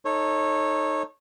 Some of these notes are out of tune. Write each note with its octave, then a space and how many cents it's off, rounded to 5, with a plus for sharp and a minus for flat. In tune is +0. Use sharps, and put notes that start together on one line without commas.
D#4 +0 A4 +5 C#5 -20